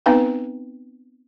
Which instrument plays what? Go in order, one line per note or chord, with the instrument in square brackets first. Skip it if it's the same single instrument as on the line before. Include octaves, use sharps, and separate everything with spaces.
[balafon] B3 C4 D#4 B4 F5 G5